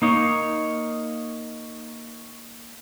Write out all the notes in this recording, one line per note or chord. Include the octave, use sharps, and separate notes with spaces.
A#3 D#4 C#5